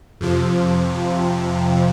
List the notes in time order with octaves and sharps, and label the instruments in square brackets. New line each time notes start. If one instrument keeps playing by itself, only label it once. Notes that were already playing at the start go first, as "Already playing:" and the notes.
[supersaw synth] F2 C3 F3